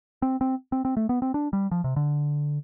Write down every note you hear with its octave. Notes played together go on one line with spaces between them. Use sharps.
C4
C4
C4
C4
A3
B3
C4
D4
G3
F3
C3
D3